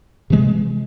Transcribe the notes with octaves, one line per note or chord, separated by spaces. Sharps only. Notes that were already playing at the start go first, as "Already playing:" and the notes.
C3 E3 G#3